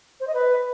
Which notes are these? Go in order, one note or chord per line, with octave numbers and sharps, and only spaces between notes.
C5
D#5
B4